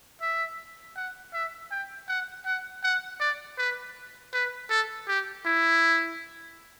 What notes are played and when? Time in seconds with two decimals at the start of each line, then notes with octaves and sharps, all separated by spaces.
0.21 E5
0.96 F#5
1.33 E5
1.71 G5
2.08 F#5
2.46 F#5
2.84 F#5
3.20 D5
3.58 B4
4.33 B4
4.70 A4
5.08 G4
5.46 E4